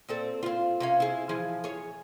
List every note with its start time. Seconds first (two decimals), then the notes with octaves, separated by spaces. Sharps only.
0.08 A#2 C4 A4
0.43 C4 F4
0.80 C3 C#4 F5
1.00 E4 G#4
1.29 E3 F3 G#4
1.64 G#4 C#5